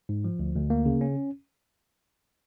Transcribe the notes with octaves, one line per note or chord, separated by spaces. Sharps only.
G#2
F3
D2
D2
A#3
C#3
C#4